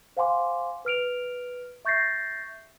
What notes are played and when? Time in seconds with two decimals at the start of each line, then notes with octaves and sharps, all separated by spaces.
0.17 C5 F5 F#5 G#5 C6 D6
0.85 B4 F6 D7 F7
1.85 E5 C#6 G6 A6 A#6 C7